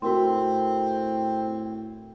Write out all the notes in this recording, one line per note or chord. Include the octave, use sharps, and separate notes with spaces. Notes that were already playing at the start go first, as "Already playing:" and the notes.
A2 C4 F#4 A#4 C6